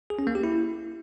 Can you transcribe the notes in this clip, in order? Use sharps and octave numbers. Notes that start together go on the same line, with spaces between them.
G#4
C#4
A#3
G4
E4